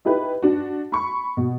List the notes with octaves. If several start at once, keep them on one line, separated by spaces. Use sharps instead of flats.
D#4 E4 G4 B4
D4 F#4
B5 C#6
B2